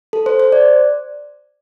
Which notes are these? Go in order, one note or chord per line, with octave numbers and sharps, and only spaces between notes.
A4
C5
C5
D5